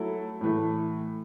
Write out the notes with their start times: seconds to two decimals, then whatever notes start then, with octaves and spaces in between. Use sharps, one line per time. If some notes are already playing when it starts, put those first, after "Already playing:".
Already playing: F#3 A3 E4 A4
0.41 A2 E3 A3